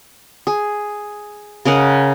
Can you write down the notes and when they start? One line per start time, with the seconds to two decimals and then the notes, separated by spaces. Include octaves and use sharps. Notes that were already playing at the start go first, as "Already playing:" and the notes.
0.47 G#4
1.65 C#3 A#4 D#5 F#5